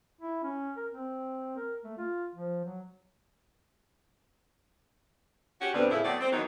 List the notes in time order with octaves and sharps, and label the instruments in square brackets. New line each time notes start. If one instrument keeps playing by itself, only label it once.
[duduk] E4
C#4
A#4
C4
A#4
A3
F4
F3
F#3
[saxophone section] C#4 F#4 G4
D2 G2 D3 G3 B3 C4
A2 C#3 E4
F#3 A3 B3 C4 D5
C4
D#3 E3 F#3 B3 D#4